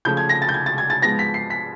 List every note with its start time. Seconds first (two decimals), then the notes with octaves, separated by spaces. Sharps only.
0.05 C#3 F3 A3 G6
0.17 G#6
0.29 A#6
0.42 A6
0.49 G6
0.54 G#6
0.66 A6
0.78 G#6
0.90 A6
1.02 G#2 F3 G#3 B3 A#6
1.19 B6
1.34 C7
1.50 B6